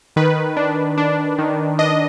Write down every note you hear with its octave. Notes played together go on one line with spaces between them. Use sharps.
D#3 B4
D4
D4
D#3
D4 D#5